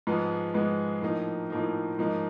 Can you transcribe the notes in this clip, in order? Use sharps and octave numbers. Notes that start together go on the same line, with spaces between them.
G#2 F3 G#3 B3
G#2 F3 G#3 B3
A2 F3 A#3 D#4
A2 F3 A#3 D#4
G#2 F3 A#3 D#4